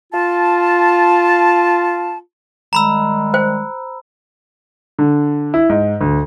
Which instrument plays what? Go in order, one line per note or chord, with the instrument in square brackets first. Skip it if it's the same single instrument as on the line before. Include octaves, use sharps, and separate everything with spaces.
[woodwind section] F4 A5
[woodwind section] D#3 G3 G#3 [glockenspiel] A#5 B5 E6
[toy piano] C5 G5
[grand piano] D3
E4
G#2
D2